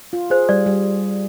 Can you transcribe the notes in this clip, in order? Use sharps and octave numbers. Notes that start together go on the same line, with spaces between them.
F4
G#4 C5
G3 D5
G3